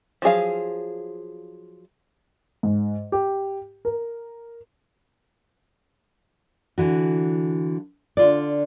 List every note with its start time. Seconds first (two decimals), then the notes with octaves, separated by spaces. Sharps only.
0.22 F3 F#3 G#4 F5
2.63 G#2
3.12 G4
3.85 A#4
6.78 D3 E3 F#4
8.17 D3 F4 D5